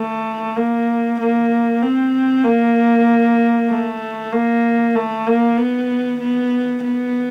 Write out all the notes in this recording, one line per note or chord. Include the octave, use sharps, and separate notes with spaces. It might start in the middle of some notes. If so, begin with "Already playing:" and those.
Already playing: A3
A#3
A#3
C4
A#3
A3
A#3
A3
A#3
B3
B3
B3